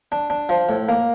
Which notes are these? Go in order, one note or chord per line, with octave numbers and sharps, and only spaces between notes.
D4
D4
F3
A2
A#3